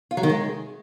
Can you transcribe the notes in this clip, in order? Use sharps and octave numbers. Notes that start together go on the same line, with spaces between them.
F4
F#3
D#3
G#3